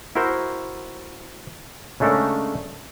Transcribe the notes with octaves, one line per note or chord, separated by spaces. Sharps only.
E4 F#4 A#4 C5
C#3 G#3 A3 D4 A4 A#4